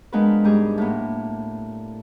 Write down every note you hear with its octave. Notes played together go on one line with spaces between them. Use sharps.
F3 G#3 B3 D4 A#4 B4
G#2 G3 G4 G#4
A2 A#3 B3